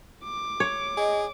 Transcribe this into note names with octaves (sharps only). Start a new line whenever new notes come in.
D6
C#5
G#4 D#5